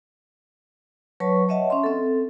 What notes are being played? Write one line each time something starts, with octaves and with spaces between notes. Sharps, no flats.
F#3 B4 C#5 A5 C#6
C#5 D#5 E5 F#5 A5
C#4 E5 C6
C4 A4